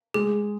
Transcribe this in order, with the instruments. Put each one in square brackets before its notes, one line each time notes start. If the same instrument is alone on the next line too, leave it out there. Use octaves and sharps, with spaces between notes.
[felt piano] G#3 [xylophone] G#4